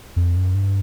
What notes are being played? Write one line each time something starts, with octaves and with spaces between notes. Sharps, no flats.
F2
F#2
G2